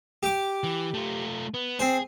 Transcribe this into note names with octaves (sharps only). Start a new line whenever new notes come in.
G4 D6
E3
A3 F4
B3
C4 G#4 C5